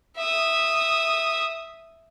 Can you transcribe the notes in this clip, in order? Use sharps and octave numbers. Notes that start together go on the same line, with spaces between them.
E5 D#6